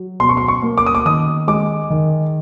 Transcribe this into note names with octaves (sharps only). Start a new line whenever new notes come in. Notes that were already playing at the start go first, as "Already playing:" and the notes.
Already playing: F#3
B2 C6
C#6
C6
C#6
A#3
D6
D#6
D6
D#3 D#6
G#3 D6
D#3